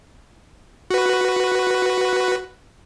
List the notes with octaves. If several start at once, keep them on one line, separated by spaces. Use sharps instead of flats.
F#4 B4